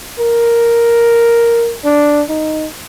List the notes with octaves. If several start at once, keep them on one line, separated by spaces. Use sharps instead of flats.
A#4
D4
D#4